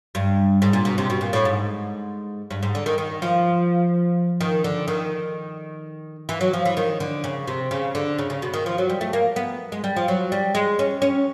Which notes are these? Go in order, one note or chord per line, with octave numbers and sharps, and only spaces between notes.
G2
G#2
A#2
B2
C3
B2
A#2
A2
G#2
G2
G#2
D3
D#3
D#3
F3
D#3
D3
D#3
E3
F#3
F3
E3
D#3
D3
C#3
C3
C#3
D3
C#3
C#3
B2
D#3
F3
F#3
G3
A3
A#3
B3
G#3
G3
F3
F#3
G3
G#3
C#4
C#4